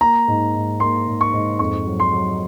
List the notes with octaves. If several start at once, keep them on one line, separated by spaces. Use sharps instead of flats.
A#3 A#5
G#2
G#2
A#3 C6
G#2
C#6
G#2
F2 C#6
F#3
C6
F#3